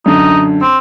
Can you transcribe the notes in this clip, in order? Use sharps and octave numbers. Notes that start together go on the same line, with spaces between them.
F#2 D3 D#4
C4